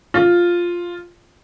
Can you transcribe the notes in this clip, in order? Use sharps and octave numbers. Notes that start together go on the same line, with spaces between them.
F4